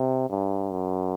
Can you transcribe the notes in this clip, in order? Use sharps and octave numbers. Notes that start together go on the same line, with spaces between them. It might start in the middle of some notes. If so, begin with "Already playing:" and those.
Already playing: C3
G2
F#2